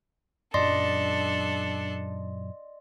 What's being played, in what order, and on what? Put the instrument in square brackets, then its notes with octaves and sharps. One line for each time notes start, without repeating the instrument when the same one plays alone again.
[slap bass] F#2 A#2 F#3 [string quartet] D4 A4 [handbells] D5 D#5 C6